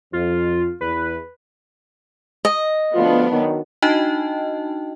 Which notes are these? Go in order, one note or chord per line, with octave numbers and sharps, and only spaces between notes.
F2 F4
E2 B4
D#5
D2 F3 B3 D4 F4
D#3 F#3
D4 D#4 F#4 D#5 G5 A5